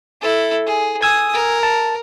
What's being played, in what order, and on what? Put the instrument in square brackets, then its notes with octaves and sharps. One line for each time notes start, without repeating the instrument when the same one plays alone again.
[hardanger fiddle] E4 A4
G#4
[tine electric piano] G#5 E6 G#6 [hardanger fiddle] D#6
[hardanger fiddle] A#4
[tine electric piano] A5